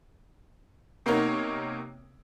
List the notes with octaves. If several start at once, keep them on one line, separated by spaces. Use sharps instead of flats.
C3 A#3 B3 D#4 A#4 C#5